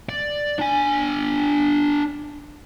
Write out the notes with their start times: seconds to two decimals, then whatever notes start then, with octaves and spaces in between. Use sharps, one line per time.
0.09 D5
0.59 D4 G#5